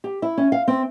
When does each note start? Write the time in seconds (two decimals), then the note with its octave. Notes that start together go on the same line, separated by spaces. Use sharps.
0.04 G4
0.22 E4
0.37 C#4
0.52 F5
0.68 C4